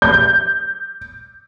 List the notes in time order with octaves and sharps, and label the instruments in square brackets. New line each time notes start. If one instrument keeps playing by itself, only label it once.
[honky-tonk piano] G6